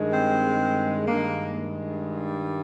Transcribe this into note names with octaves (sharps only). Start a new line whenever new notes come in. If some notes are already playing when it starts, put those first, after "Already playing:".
Already playing: G2 D#3 G#3
C4
G2 D#3 G#3 A#3